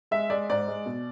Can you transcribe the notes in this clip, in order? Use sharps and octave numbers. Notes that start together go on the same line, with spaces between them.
G#3 E5
G#3 D5
G#2 D5
G#3
B2